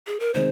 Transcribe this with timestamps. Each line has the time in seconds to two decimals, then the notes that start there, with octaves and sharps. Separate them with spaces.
0.07 G#4
0.20 A#4
0.34 C3 D#3 G#3 D#4 C5